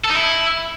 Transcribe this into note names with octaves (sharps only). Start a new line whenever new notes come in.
A4
D#4
E4